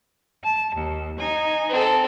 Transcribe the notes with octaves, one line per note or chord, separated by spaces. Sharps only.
A5
D#2
D#4 G#5
C4 A4